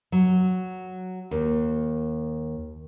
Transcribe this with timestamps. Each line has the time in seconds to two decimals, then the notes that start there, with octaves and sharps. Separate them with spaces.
0.12 F#3
1.31 D#2